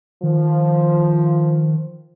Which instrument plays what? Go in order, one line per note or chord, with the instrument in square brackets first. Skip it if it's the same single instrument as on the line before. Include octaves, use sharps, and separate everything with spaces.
[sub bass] D#3 [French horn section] F3